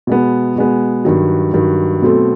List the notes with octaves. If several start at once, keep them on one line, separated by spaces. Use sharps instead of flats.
B2 G#3 B3
B2 G#3 B3
G2 D#3 F#3
G2 D#3 F#3
B2 F#3 A3 C4